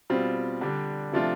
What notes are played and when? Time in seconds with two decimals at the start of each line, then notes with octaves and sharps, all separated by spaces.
0.10 B2 G3 C4 F4
0.61 D3 G3 D4
1.12 C3 F3 A3 D4 F4